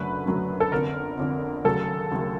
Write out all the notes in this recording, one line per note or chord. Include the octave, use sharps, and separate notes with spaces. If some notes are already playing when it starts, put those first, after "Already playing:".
Already playing: F#1 F#2 D3 F#3 A3 B4
F#1 F#2 D3 F#3 A3
A4
G1 F2 D3 A#4
G1 F2 D3
D#2 C#3 F#3 A3 A4
D#2 C#3 F#3 A3